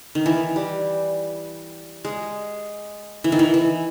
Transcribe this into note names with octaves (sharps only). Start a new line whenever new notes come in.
D#3
E3
G3
G#3
E3
D#3
E3
E3